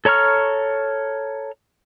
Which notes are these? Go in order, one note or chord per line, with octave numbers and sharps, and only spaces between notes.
A4 C#5 A#5 C#6 F6